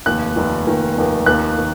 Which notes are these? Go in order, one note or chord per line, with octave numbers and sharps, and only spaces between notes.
F1 D#2 D#3 F#6
F1 D#2 D#3
F1 D#2 D#3
F1 D#2 D#3
D#2 D#3 A#3 F#6
D#3